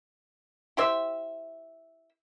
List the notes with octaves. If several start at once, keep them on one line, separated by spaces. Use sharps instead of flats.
E4 G4 C5 E5